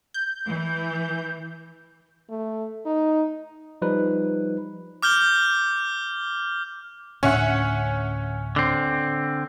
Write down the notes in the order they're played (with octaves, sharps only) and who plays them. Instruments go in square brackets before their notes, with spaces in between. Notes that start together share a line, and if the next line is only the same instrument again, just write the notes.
[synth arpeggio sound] G6
[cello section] E3
[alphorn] A3
D#4
[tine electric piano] F3 G3 D#4 B4
[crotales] D6 F6 G6 G7
[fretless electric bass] D2 A2 D4 [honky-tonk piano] C#4 E5 F#5
[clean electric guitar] D3 C4